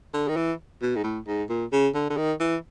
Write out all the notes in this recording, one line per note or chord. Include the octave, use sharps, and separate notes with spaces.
D3
D#3
E3
B2
G#2
A2
G#2
A#2
C#3
D3
D3
D#3
E3